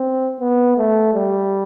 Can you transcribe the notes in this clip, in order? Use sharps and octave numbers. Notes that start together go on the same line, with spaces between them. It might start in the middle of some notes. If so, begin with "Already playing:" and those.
Already playing: C4
B3
A3
G3